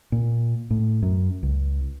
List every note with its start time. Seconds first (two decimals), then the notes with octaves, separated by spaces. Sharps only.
0.12 A#2
0.70 A2
1.02 F#2
1.43 C#2